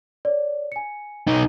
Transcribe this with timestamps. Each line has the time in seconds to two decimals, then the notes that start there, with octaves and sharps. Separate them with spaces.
0.25 C#5 D5
0.72 G#5 C#7
1.27 B1 D#4